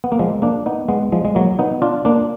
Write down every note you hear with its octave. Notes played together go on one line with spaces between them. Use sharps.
B3
A#3
F3 G#3
A#3 D4
B3 D#4
G#3 B3
F3 G#3
G#3
F#3 A#3
B3 D#4
D4 F4
A#3 D4